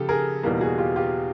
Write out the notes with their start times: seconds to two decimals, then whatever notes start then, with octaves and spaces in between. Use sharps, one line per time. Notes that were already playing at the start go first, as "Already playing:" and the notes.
Already playing: C#3 F3 G4 A4
0.09 G#4 A#4
0.43 E2 B2 G3 A#3
0.60 F#4 G#4
0.78 F4 G4
0.96 F4 G4